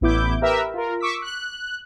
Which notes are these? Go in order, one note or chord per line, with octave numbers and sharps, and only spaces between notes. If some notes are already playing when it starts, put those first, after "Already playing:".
A1 B3 E4 D6 G6
G4 A#4 B4 E5
F4 A#4
C#6 D6 E6 B6
F#6